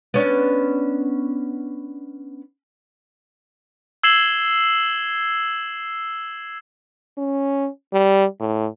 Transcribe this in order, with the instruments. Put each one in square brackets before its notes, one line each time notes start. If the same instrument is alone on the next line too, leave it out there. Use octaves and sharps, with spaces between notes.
[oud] B3 C#4 D4
[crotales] E6 G#6 C7 E7 F#7 G7
[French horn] C#4
G3
A2